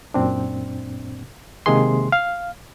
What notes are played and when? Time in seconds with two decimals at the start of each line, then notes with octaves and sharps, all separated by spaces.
0.14 F#2 A#2 C4 D4
1.66 C3 D#3 G#3 A#3 G#4 C6
2.12 F5